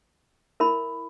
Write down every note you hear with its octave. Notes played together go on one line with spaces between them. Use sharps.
E4 A#4 E5 B5